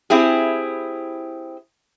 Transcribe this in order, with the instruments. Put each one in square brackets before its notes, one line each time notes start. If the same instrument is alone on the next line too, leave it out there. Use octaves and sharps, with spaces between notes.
[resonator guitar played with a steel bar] C4 E4 G4 G#4